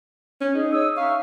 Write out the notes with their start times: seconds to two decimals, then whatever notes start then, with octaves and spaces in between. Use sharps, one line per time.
0.41 C#4
0.55 D#4 G#4
0.72 C#5 D#6 E6
0.97 D#4 E5 F5 C#6